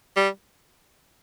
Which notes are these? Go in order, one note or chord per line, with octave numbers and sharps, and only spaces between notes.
G3